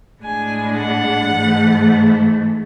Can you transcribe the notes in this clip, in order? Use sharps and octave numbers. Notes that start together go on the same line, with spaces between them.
A2 G#3 D4 G#5
F#5
G#2 E3 A3